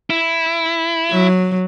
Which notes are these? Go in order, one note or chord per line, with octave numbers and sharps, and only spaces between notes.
E4
F#3